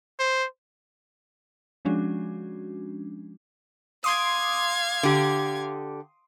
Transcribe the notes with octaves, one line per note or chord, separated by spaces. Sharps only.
C5
F3 G#3 C#4 D4 F#4
F5 C6 D6 D#6 G#6
D3 G4